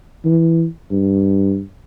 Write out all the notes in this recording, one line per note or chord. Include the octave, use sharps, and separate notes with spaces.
E3
G2